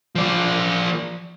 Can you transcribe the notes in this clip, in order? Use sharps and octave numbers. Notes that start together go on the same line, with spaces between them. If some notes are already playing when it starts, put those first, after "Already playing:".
F3 D5